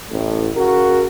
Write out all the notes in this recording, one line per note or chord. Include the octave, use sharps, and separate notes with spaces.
A1 A2
C#3 F#4 A#4